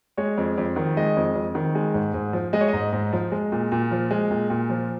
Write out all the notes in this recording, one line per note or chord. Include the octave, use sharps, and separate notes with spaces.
G#3 C#5
F2
F2
D#3
G#3 D#5
F2
F2
D#3
G#3
G#2
G#2
F3
G#3 D#5
C#5
G#2 D#5
G#2
F3
G#3
A#2
A#2
F3
G#3
A#2
A#2
F3